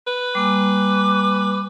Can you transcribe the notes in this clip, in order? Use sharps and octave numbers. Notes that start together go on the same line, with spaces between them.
B4
G3 A#3 G#5 D6